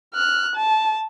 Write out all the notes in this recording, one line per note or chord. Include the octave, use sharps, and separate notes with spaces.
F6 F#6
A5